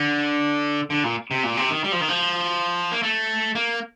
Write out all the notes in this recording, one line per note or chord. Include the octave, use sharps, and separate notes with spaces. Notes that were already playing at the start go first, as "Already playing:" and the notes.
Already playing: D3
D3
A#2
C3
A#2
C3
D#3
G3
F3
D#3
F3
A#3
A3
A#3